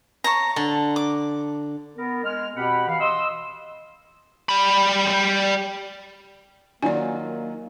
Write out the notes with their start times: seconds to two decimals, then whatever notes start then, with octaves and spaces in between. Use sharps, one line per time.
0.24 C#5 A5 A#5
0.56 D3 A5
0.96 D6
1.96 B3 A#4
2.24 G#3 F6
2.55 B2 C4 G4 F#5 B5
2.87 E3 F5
3.00 D#5 C6 E6
4.49 G3 B5
6.82 D#3 F#3 A#3 F4 D5 G#5